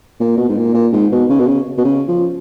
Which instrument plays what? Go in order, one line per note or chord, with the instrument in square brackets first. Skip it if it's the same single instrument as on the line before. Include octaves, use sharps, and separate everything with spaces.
[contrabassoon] A#2
B2
G#2
A#2
A#2
G#2
B2
C#3
B2
C#3
B2
C#3
F3